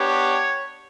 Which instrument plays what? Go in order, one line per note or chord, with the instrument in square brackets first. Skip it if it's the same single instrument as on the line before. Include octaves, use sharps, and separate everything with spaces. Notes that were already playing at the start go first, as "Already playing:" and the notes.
Already playing: [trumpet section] B3 D4 G4 C#5